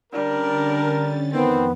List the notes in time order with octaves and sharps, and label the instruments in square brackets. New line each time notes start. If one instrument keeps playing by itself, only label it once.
[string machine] D3 C#4 A6 [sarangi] G3 [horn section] D4 A#4
[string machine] F2 [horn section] D#3 C4 [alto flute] B3